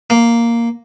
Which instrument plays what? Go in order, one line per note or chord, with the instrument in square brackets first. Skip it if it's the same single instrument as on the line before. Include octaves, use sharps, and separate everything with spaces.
[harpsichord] A#3